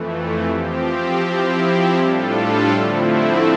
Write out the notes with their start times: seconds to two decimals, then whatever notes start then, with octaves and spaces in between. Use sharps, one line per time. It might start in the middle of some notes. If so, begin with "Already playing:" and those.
Already playing: F2 E3 A3
0.46 F3 C4 G4
1.21 F3 C4 E4 G4
1.96 A2 G3 D4 F4 A4
2.72 D3 F3 A3 C4 E4